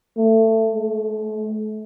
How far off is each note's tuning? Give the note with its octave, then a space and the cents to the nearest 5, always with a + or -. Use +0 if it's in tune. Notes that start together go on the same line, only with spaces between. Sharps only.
A3 +20
A3 -35